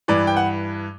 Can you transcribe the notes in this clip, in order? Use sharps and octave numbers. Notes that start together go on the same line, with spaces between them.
G2 E3 D5
G5
F#5